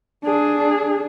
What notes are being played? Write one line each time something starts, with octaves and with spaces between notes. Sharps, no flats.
D4 G#4